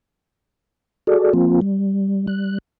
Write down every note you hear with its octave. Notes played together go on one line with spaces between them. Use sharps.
F#4 G#4 A4 D5
F3 A#3 C4 F4
G3
G3 F#6